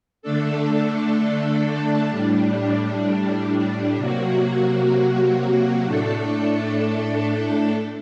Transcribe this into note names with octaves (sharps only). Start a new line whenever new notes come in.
D3 A3 D4 A4
A2 G3 D4
C3 F#3 A#3 F#4
A2 A3 D4 A4